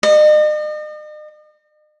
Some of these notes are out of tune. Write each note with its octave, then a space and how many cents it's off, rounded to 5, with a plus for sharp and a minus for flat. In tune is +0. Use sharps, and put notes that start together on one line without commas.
D#5 -40